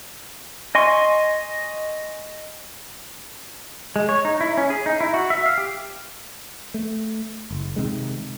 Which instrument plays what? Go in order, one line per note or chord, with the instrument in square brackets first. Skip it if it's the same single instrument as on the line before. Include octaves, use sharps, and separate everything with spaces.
[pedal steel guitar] D#5 G#5 C6 C#6
G#3
C#5
D#4
E4
C#4
G#4
D#4
E4
F#4
E5
F5
G4
[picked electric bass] A3
F#1
C3 D#3 G#3